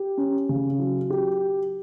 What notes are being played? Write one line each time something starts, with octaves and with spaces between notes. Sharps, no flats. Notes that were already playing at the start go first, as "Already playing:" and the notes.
Already playing: G4
C#4
C#3
F#3
G4